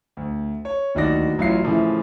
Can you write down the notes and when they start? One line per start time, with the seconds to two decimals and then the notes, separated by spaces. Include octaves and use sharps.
0.17 D2
0.65 C#5
0.95 D1 D#2 D#4 F#4 D5 A#6
1.38 A1 F#3 E4 F4 C7
1.65 A2 C#3 E3 F3